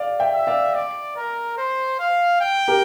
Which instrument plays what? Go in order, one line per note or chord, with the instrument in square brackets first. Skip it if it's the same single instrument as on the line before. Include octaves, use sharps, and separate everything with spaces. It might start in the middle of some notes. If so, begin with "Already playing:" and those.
Already playing: [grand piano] D5 F5
E5 G5
[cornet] E5
[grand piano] D5 F5
[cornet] D5
A#4
C5
F5
G5
[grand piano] G4 A#4